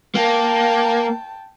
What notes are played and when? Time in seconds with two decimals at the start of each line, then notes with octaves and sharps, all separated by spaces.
0.15 A#3 G5 A5